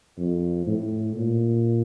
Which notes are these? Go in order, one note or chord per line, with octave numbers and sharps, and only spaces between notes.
F2
A2
A#2